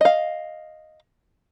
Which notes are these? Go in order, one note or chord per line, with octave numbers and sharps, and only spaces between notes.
D#5 F5